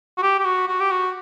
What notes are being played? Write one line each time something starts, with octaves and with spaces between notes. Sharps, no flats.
F#4
G4
G4
F#4
F#4
G4
F#4